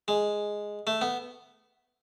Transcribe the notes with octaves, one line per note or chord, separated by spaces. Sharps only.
G#3
A3
B3